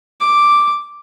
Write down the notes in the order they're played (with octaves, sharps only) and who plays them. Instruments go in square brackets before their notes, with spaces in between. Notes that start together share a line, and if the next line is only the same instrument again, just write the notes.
[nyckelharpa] D6